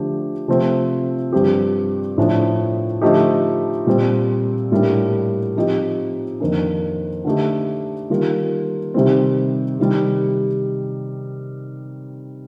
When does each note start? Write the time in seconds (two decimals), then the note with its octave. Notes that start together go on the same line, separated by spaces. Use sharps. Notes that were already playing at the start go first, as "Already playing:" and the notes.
Already playing: D3 F3 A3 D4 G4
0.48 C3 F3 A3 C4
1.33 G2 F3 C4 G4
2.18 A2 F3 A3 D4
3.02 D3 F3 A3 D#4 G4
3.87 A#2 G3 C4
4.72 A2 G3 A#3 D4
5.56 F3 C4 D#4 G4
6.40 F2 D#3 A#3 D4
7.25 D3 A3 D#4 G4
8.10 D#3 G3 A#3 F4
8.94 C3 D#3 G3 C4
9.79 C3 D#3 G3